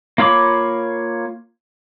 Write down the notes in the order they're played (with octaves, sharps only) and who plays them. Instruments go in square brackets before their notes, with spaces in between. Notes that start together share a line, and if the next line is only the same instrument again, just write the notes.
[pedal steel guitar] A#3 F4 C#5 B5 D6